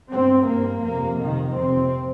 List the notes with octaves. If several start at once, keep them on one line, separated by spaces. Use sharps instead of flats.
G2 C4
G2 A#3
F2 C3 A#3
F2 C3 D#3
F2 C3 C4